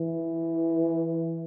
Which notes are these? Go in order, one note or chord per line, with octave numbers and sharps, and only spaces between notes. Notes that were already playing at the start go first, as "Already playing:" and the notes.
Already playing: E3